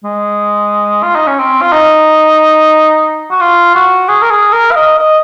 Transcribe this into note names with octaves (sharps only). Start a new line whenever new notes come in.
G#3
F4
D#4
C#4
C4
F4
D#4
F#4
F4
F#4
G#4
A#4
G#4
A#4
F5
D#5
D#5